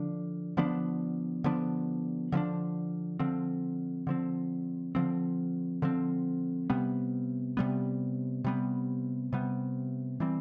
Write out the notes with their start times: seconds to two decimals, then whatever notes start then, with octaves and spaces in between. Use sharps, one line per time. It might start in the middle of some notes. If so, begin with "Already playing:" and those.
Already playing: D3 F3 D4
0.57 D3 F3 B3 D4
1.44 D3 F3 B3 D4
2.32 D3 F3 B3 D4
3.19 D3 F3 C4
4.07 D3 F3 C4
4.95 D3 F3 C4
5.82 D3 F3 C4
6.70 C3 G3 B3
7.57 C3 G3 B3
8.44 C3 G3 B3
9.33 C3 G3 B3
10.20 E3 G3 C4